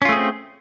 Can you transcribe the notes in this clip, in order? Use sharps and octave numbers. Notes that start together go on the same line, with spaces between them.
A3 C4 C#4 F4 G#4